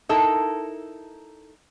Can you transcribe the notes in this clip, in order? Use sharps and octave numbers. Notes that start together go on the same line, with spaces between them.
D#4 E4 A4 A#4